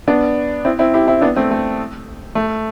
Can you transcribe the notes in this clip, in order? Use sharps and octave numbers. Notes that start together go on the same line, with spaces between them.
B3 D4
C4 E4
C4 E4
E4 G4
C4 E4
B3 D4
A3 C4
A3
A3